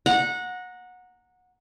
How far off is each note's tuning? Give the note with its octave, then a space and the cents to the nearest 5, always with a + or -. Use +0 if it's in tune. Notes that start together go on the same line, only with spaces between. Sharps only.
F#5 -20 A#5 +0